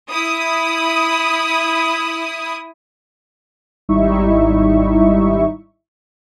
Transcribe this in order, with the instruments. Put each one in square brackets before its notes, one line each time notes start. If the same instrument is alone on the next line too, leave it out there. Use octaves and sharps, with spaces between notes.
[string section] E4 D#6
[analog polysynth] G#1 G3 D#4 E4 E5 C#6